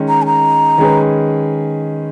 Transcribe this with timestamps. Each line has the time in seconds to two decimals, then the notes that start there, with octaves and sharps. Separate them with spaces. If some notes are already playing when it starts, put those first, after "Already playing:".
Already playing: D#3 G#3 C#4
0.09 A#5
0.22 G#5
0.26 A#5
0.78 D#3 G#3 C#4 G#4 B4